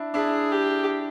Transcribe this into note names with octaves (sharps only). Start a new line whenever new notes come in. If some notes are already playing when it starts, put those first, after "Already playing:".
Already playing: D4 E4
D4 E4 G#4
G4